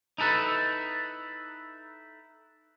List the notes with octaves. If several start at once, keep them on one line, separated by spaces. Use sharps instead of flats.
D#4 E4 A4 B4